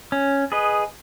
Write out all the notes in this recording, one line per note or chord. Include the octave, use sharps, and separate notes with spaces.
C#4
G#4 B4 D#5